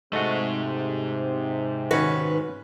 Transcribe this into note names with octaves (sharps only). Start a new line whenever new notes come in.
G#2 C3 A3 F#4 D#5
D#3 C#4 F#4 B4